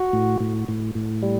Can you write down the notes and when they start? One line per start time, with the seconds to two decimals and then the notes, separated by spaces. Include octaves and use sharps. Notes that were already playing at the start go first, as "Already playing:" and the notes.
Already playing: F#4
0.13 A2
0.40 A2
0.68 A2
0.95 A2
1.23 G3